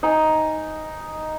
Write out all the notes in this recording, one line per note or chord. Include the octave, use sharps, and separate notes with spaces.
D#4 G#5